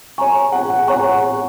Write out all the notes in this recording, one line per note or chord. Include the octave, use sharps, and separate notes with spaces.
C#5 G#5 A#5 C#6
F#5
C#5 F#5 A#5 C#6